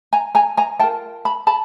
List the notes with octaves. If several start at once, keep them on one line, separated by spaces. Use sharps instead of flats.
G#5 A#5
G#5 A#5
G#5 A#5
F4 A#4 G5 A5
A5 B5
A5 B5